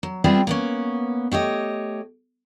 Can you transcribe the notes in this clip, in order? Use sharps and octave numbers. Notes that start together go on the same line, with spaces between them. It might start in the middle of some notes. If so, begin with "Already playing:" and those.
F#3
G3 B3 C4 F4 G#4 E5
A#3 B3 C#4
A3 G4 C#5 D#5